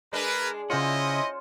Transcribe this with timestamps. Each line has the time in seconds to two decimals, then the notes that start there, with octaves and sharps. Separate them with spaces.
0.13 G#3 D4 A#4 B4
0.70 C#3 C#4 E4 F4 C5 D#5 F#5